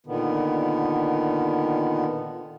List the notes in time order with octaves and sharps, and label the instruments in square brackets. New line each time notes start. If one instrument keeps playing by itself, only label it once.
[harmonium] A#2 D3 D#3 B3